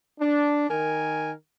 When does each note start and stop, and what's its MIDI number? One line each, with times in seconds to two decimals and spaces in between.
0.19 0.67 62
0.69 1.31 51
0.69 1.31 70
0.69 1.31 80